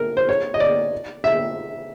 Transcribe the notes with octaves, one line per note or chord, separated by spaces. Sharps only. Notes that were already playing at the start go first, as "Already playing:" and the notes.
Already playing: A#4
C5
C#5
D#5
D5
E5